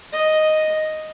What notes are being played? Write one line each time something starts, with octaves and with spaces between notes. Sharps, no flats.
D#5